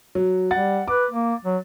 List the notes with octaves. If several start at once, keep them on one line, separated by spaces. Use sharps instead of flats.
F#3
G3 F#5 A6
B4 D6
A#3
F#3